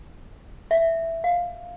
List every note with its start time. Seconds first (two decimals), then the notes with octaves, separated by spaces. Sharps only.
0.71 E5
1.24 F5